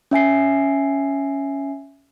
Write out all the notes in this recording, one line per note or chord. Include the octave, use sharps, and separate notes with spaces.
C#4 E5 G#5 C7